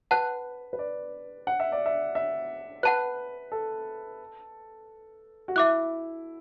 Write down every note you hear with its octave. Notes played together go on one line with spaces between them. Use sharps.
B4 F#5 A5 F#6
B4
D5
F#5
E5
D5
E5
E5
B4 F#5 A5 F#6
A4
F#4
E4 E5 D6 F#6